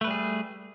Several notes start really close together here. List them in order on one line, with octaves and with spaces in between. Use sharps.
A3 B4 G3 G#4